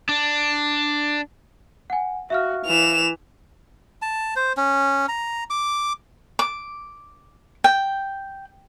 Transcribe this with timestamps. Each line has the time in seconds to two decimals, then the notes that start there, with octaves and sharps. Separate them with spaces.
0.09 D4
1.90 F#5 G#5
2.30 F#4 E5 F5 F6
2.66 E3 E7 F7
4.02 A5
4.36 C5
4.57 C#4
5.08 A#5
5.50 D6
6.39 D6
7.64 G5